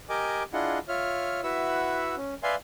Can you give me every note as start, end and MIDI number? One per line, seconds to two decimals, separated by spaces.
0.09 0.43 67
0.09 0.43 70
0.09 0.43 75
0.09 0.43 80
0.09 0.43 86
0.53 0.79 62
0.53 0.79 64
0.53 0.79 65
0.53 0.79 68
0.53 0.79 75
0.53 0.79 78
0.88 1.41 65
0.88 1.41 73
0.88 1.41 76
0.88 1.41 89
1.44 2.15 64
1.44 2.15 66
1.44 2.15 71
1.44 2.15 76
1.44 2.15 78
1.44 2.15 88
2.17 2.34 61
2.43 2.55 71
2.43 2.55 74
2.43 2.55 76
2.43 2.55 77
2.43 2.55 80
2.43 2.55 84